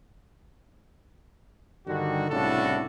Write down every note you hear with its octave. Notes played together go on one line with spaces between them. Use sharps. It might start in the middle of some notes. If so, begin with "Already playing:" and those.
G2 D3 D#3 G3 F#4
C2 A2 C#3 D4 F#4 A4